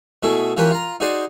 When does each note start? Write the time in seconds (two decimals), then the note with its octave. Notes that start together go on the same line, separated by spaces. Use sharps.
0.23 B2 A3 E4 G#4
0.57 E3 F3 C#4 G4 A#4 B4
0.71 F4 A#5
1.00 D#4 F#4 G#4 C5 D5